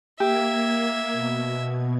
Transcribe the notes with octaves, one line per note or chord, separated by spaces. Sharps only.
A#3 G4 E5 G#6
B2